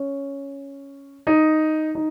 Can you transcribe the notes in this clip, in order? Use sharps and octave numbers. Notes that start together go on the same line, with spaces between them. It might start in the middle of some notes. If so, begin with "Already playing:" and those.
Already playing: C#4
D#4
D#4